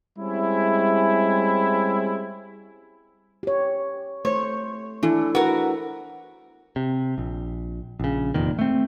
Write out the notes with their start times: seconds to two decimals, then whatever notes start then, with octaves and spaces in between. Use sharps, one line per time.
0.18 G3 G#3 C4 C#4 E4
3.43 G4 C#5
4.25 A3 C5 C#5
5.03 E3 D4 E4 A4
5.35 F#4 A#4 B4
6.76 C3
7.18 A#1
8.00 A#1 C#3
8.34 F1 E2 A#2 D#3
8.59 A3 C4